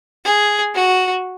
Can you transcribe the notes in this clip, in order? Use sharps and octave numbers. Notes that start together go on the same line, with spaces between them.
G#4
F#4